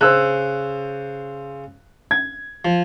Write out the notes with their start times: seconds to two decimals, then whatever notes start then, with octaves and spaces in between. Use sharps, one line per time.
0.01 C#3 C5 E6 F#6
2.11 G#6
2.65 F3